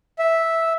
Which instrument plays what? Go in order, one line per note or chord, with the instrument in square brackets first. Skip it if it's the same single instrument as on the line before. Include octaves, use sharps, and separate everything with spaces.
[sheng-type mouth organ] E5